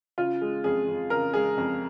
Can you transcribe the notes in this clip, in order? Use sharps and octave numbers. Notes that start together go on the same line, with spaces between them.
C#3 F4
G#3
F2 G#4
F2
C#3 A#4
G#3 G#4
F2